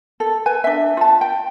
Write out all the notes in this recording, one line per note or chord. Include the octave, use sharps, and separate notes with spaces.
A4
B4 G#5
D4 E5
F4 A5
G5